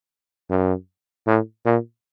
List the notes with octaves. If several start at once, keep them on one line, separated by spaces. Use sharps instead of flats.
F#2
A2
A#2